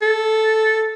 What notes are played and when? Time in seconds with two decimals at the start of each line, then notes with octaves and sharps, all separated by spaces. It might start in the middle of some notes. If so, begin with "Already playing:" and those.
0.02 A4